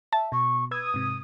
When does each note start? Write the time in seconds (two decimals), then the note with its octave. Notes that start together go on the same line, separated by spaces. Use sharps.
0.13 E5 A5
0.32 B2 C#6
0.71 B4 D#6 E6 G#6
0.94 G#2 C3